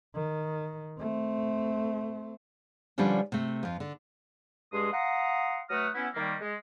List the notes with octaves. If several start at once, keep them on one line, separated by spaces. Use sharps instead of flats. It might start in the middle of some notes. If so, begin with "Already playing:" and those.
D#3
A3 C4
D3 F3 G3 C#4 D4 B4
C3 A3
F2 F3
D3
G2 G#3 G#4 C6 D#6
F5 F#5 A#5 C6 D#6
F#3 A3 B4 F#5 D#6 F6
B3 C#4 E4
D#3 G3 A#3
G#3